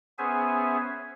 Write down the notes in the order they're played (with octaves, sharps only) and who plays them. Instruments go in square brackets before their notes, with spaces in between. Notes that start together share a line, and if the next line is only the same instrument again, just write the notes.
[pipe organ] B3 C#4 G#4 C5 E5 G#5